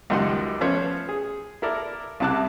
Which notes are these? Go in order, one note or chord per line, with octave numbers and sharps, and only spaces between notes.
C#2 F#2 D#3 G3 F#5 C6
F3 A3 B3 C#4 C5 C#5
G#4
E4 A4 A#4 D5
C2 C3 E4 A5 D6 F#6